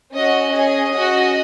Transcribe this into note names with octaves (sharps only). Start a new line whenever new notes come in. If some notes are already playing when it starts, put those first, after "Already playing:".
C#4 F#4 D#5
C#4 G#4 D#5
C#4 F#4